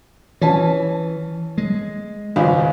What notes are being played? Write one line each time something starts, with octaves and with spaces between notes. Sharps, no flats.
E3 C#4 A5
G#3
G#1 C#2 F5